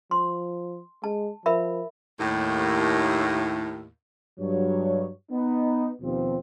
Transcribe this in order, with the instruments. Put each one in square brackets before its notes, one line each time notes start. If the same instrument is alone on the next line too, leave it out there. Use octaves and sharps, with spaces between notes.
[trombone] F3 [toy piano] C6
[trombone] G#3 [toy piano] A5
[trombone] F3 [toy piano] A#4 E5 B5
[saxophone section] D#2 A2
[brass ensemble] G2 F#3 C#5
B3 D#4
D#2 B2 F3 C4